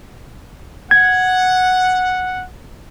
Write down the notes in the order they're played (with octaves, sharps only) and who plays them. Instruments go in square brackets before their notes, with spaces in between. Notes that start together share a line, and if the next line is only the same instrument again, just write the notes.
[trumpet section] F#5 [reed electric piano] G#6